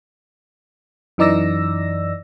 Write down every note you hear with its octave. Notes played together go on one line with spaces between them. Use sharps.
F#2 E3 D#4 D5 E6 A#6